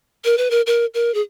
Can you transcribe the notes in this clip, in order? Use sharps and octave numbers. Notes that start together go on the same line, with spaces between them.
A#4
B4
A#4
A#4
A#4
G#4